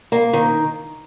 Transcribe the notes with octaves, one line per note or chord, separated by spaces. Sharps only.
A#3
D#3